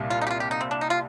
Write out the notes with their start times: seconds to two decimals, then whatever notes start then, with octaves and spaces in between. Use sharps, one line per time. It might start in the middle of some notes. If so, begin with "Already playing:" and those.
Already playing: C2 A#2 G3
0.10 F4
0.21 D#4
0.27 G4
0.31 F4
0.40 G4
0.51 D#4
0.61 C4
0.71 D4
0.81 D#4
0.90 F4